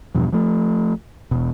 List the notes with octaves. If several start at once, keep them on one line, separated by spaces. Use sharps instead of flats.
E2 G2 B2 F3
F3 A3
E1 B2